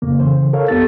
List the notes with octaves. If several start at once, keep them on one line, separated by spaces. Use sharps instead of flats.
F2 C#3 A#3
C#3 E3 C5
A4 A#4 C#5 F5
F2 B3 G4 A4 A6